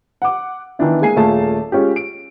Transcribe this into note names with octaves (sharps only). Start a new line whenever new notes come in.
F#5 D6
D#3 E3 B3 D4 E4
G#3 A#3 G#5 C7
D#1 A3 A#3 F4 G#4 A5
G#3 C#4 F4 G4
D7